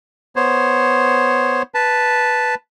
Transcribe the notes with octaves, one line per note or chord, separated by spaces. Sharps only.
B3 C5 C#5
B4 A5